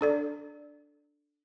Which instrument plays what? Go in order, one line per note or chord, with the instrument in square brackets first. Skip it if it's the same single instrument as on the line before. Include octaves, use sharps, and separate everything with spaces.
[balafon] D4 A4 D5